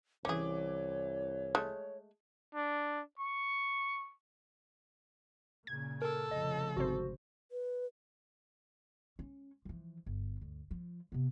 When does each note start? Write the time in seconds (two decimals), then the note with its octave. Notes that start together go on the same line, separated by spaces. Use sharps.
0.25 C2 E3 C#4 G#4 C#5 D6
1.55 G#3 A3
2.54 D4
3.19 C#6
5.67 A#2 C#3 G#6
6.02 A4 A#4
6.31 F1 C#3 F3 D#5
6.77 G#1 C3 F#4 C5
7.52 B4
9.19 C#4
9.65 E3 F3
10.06 G1
10.41 D2
10.71 F3
11.12 C3 B3